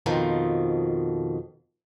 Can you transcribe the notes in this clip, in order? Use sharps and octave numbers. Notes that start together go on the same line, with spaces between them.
F2 B2 D#3 F3